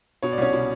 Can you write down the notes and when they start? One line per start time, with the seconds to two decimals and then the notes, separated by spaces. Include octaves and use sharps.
0.23 B2 C#5
0.32 D5
0.38 C2 C#4 C#5
0.53 B2